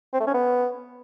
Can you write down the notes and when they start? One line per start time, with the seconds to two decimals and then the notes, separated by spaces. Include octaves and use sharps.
0.13 C4
0.20 A3
0.27 C#4
0.34 B3